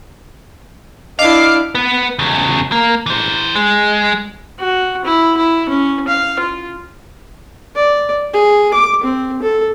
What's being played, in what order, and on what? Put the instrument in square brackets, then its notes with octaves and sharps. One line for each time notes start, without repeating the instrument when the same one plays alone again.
[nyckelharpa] D4 E4 [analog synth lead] D#5 [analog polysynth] F5 D6 C7
[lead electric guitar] B3
E2 C#3
A#3
E3 C5
G#3
[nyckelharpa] F#4
E4
E4
C#4
F5
F4
D5
G#4
D6
C4
A4